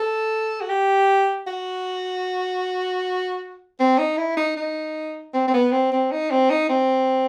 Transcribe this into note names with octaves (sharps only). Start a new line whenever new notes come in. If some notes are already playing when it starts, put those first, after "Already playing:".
Already playing: A4
F#4
G4
F#4
C4
D#4
E4
D#4
D#4
C4
C4
B3
C4
C4
D#4
C4
D#4
C4